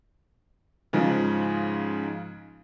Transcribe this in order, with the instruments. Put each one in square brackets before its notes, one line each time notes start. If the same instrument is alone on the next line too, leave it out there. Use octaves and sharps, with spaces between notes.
[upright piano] G#2 C#3 F3